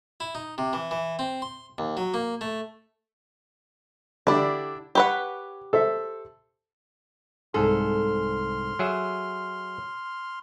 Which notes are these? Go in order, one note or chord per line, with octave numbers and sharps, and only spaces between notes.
E4
D#4
C3
E3
E3
C4
C6
D#2
F#3
A#3
A3
D3 D4 E4 G4 D5
G4 B4 C#5 F#5
A4 C5 E5
C2 G#2 G#4 A4 C6 F6
F#3 G#4 E5